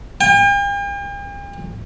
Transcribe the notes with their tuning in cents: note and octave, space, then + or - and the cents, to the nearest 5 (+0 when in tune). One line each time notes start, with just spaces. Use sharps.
G5 +45